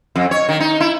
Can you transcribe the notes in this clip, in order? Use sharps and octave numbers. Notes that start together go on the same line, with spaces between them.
F2
C#5
D#3
D#4
E4